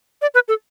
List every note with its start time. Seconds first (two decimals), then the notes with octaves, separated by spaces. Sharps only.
0.22 D5
0.34 B4
0.48 A4